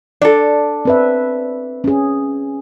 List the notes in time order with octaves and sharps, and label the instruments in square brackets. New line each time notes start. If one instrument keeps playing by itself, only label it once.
[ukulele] D4 A4 [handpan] D5
[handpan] C4 B4 E5
C#4 G#4